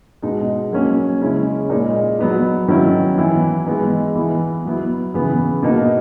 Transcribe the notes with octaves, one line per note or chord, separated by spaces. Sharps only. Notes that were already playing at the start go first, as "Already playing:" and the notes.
B2 G#3 D#4
F#3 A#3 C#4
C#3 G#3 C#4 E4
A#2 G#3 D#4
F#3 B3 D#4
D#3 F#3 C#4 E4
E3 B3 E4
E3 G#3 B3 D#4
E3 B3 E4
F#3 B3 E4
C#3 E3 B3
B2 A#3 D#4